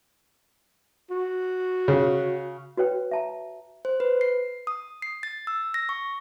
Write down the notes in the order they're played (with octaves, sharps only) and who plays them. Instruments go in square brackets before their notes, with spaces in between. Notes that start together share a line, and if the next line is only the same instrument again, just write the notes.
[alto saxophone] F#4
[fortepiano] C#3
[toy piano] F#4 B4 C#5 G5
E5 A5 A#5
[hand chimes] C5
B4
C7
D#6
C7
A6
E6
A#6
C#6